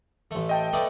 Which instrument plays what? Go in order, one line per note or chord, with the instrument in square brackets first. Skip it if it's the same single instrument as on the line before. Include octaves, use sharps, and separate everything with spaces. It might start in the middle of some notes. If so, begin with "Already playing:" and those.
[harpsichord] A1 A3
[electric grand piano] D#5 G5 A5
[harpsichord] A3 B3 D5